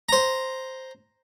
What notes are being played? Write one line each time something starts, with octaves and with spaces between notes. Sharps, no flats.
C5 A#5